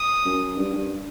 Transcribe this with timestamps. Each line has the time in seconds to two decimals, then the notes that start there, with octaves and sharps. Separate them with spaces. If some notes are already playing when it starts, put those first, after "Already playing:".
Already playing: D#6
0.25 F#2
0.57 G2
0.72 G2